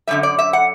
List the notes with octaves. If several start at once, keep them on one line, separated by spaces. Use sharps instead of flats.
F#2 D3 G3 E5
D5
E5
F#5